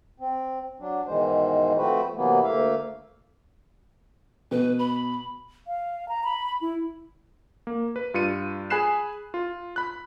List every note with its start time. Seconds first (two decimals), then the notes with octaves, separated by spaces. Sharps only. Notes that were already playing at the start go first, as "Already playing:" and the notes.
0.20 C4
0.80 F#3 D4
1.07 G#2 B2 D#3 E3 G#3 C5
1.78 F3 A3 C4 F#4 B4 C5
2.16 C3 E3 F#3 A#3 B3
2.44 D2 A3 A#3 E5 F5
4.51 B2 B4
4.79 B5
5.67 F5
6.09 A#5
6.24 B5
6.61 E4
7.67 A#3
7.96 B4
8.14 G2 F4 C#7 D#7
8.70 G#4 G#5 B5 F#6 C7 E7
9.34 F4
9.76 B5 F#6